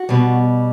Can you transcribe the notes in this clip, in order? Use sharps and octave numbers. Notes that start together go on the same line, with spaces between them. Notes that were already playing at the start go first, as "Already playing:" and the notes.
Already playing: F#4
B2 G3